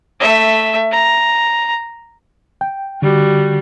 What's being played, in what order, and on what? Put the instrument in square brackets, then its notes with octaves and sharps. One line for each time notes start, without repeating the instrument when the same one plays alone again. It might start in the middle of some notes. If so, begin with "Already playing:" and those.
[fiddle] A3 E5
A#5
[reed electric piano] G5
[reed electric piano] D3 [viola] G3 F#4